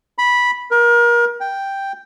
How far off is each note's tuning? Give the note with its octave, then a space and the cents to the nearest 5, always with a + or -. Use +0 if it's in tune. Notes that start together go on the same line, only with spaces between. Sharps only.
B5 -10
A#4 +30
G5 +0